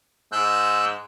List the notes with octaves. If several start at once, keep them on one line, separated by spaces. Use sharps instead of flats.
G#2 E6 F#6 G6